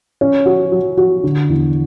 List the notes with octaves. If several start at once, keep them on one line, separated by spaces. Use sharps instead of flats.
C#4
F#4
F#3
F#4
D3
E2